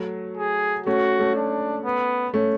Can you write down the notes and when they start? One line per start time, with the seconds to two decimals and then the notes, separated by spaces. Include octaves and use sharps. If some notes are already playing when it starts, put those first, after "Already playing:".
Already playing: F#3 A3
0.37 G#4
0.86 A3 C#4 F#4
1.19 A3 C#4
1.35 D4
1.85 B3
2.34 A3 C#4